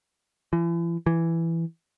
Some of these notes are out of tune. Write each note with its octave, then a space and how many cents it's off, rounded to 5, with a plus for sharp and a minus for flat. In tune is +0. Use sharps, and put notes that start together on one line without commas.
E3 +40
E3 +10